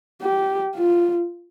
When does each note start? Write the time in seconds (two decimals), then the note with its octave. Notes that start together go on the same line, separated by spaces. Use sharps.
0.22 G4
0.75 F4